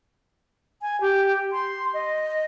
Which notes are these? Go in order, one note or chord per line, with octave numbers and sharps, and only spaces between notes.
G#5
G4
C6
D#5